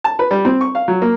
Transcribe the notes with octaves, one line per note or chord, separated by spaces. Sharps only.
A5
B4
G3
C4
C#6
F5
F#3
A#3